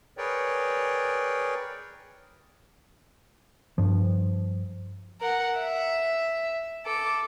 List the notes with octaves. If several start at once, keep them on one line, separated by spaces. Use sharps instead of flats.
G#4 A#4 B4 C#5 D5 G5
G2 F3
A#4 F#5
E5
A4 D6